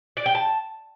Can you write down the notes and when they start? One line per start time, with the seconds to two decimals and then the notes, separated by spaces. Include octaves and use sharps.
0.17 D5
0.26 G5
0.35 A5